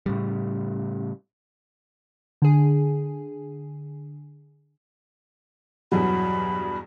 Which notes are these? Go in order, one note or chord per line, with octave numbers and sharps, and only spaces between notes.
A2 C#3 G3
D3 G#4
E2 G2 B2 F#3 B5